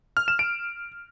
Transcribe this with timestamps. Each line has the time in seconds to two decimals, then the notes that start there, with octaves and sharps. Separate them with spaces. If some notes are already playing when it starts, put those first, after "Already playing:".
0.17 F6
0.28 E7
0.39 D7